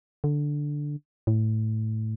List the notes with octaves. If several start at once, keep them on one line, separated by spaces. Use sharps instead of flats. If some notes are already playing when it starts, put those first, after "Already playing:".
D3
A2